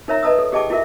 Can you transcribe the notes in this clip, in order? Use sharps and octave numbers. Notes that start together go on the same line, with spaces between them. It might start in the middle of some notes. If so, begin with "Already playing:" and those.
D#4 A#4 C#5 E5 A#5
B4 D#5 A5 A#5 D#6 E6
A4
G4 G#4 D#5 G5 A5 D6
E4 F#4 A#4 E5